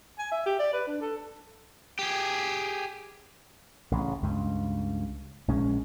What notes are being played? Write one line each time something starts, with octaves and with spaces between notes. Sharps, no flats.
G#5
E5
G4
D5
B4
D4
A4
G4 G#4
A1 C#3
C#2 G2
A#1 G#3 C#4